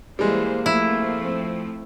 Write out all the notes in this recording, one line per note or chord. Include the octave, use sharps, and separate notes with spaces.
E3 G3 G#3 A#3 C5
F3 A3 C4 E4